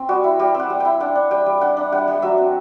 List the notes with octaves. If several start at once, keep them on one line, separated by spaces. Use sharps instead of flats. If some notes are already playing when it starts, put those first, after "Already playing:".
Already playing: C4
G3 F#4
E4
G3 G4
C4
F#5
G3
E4 G5
D4 F#5
D4
G3 G5
G3
D4 F#5
D4
G3 F#5
G3
F#3 E5
C4